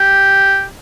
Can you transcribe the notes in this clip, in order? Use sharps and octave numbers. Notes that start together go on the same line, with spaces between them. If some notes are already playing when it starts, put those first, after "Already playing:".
Already playing: G4